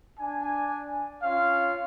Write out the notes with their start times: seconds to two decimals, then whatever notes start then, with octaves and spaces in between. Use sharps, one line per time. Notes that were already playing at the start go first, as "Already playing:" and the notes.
0.19 D4 G#5
1.23 C#4 F4 F5